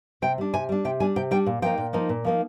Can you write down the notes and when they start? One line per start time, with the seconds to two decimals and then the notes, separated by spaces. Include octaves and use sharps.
0.22 C3 G5
0.38 G3 D4
0.54 C3 G#5
0.69 G3 D4
0.85 C3 G5
1.00 G3 D4 G#5
1.16 C3 G5
1.31 G3 D4 G5
1.46 A#2
1.62 F3 A#3 D#4 G5
1.78 A#2
1.93 F3 A#3 D#4
2.09 A#2
2.25 F3 A#3 D#4